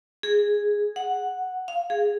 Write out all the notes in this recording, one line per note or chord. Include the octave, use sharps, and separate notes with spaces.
G#4
F#5
F5
G#4